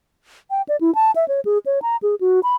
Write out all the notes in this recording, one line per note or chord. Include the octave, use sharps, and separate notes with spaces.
G5
D5
E4
A5
E5
C#5
G#4
C#5
A#5
G#4
F#4
B5